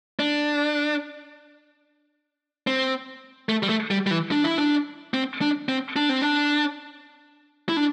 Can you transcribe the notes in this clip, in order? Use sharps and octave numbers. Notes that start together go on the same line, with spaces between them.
D4
C4
A3
G3
A3
G3
G3
E3
D4
E4
D4
C4
D4
C4
D4
C4
D4
E4
D4